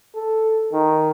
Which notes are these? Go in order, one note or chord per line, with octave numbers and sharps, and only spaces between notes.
A4
D#3